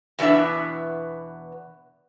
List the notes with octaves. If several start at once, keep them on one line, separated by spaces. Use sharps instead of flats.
E2 B2 B3 D4 E5